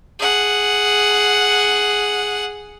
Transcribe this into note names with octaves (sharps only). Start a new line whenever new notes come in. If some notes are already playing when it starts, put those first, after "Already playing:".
G#4 F#5